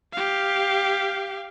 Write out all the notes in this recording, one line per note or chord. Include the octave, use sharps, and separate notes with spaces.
G4 F5